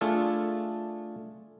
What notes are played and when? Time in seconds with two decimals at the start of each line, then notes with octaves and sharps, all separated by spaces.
0.01 A3 D4 F4 G#4 A4